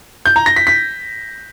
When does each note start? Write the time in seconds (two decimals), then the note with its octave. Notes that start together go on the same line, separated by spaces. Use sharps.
0.26 G6
0.36 A#5
0.46 A#6
0.56 B6
0.67 B6